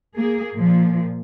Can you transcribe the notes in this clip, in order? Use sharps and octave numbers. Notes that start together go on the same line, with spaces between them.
A#3 G#4
A#2 F3